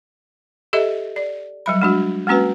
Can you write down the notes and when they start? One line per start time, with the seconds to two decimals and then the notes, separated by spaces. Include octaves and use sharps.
0.73 G4 A4 D#5 E5
1.16 D5
1.66 F#3 G3 B5
1.82 G#3 D4 F#4
2.27 G#3 A#3 C#4 F#4 B4